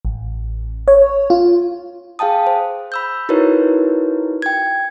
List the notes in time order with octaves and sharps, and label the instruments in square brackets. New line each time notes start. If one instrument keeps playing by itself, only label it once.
[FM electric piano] A1
C#5
F4
[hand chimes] G#4 F5 G5 A5 D#6
C5
B5 E6 G6
D#4 E4 F#4 A#4 B4 C#5
G5 G#6